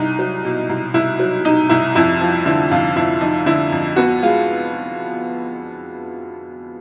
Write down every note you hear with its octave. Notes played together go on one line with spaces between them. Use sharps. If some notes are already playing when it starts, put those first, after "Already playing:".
Already playing: C2 D#4
F#3
B2
C2
C2 E4
F#3
B2 D#4
C2 E4
F2 E4
F3
D3 E4
F2 F4
F2 E4
F3 D#4
D3 E4
F2
B3 F#4
G#3 F4